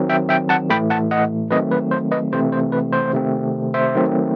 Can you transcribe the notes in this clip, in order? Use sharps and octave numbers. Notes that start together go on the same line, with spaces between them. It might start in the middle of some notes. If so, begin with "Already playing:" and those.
Already playing: D#3 F#3 C4
E5 G5
E5 G5
F#5 A5
A2 E3 A3 G5 B5
F#5 A5
D#5 F#5
D#3 F#3 A3 C4 B4 D#5
B4
C5
B4 D#5
C3 E3 A3 C4 C5
C5
B4
C5
C3 D#3 A3 C4
C5 E5
D#3 F#3 A3 C4